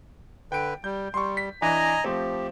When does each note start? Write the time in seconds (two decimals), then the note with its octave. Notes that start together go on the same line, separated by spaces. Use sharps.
0.52 D3 B4 G5 D7
0.84 G3 G6
1.14 G3 C6 C#6
1.37 B6
1.62 E3 D4 D#5 G#5 A#5
2.04 F3 A3 C4 G4